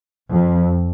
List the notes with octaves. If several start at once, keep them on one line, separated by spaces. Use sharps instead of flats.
F2